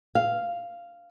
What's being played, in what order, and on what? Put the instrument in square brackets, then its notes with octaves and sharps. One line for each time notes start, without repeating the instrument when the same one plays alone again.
[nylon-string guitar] F5